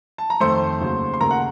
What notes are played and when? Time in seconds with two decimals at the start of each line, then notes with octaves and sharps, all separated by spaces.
0.18 A5
0.30 A#5
0.40 F2 D#3 A3 C5 C6
0.81 D#2 C#3 F#3
1.14 C6
1.20 D#2 C#3 A3 A#4 A#5
1.31 F#5